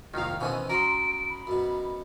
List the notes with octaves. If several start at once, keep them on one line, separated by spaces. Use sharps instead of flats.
C2 F2 A#2 D#3 F5
B2 D#3 E3 C4 C#4 D#7
C#4 F#4 D#5 A#5 C6 D7
B5
F#2 B2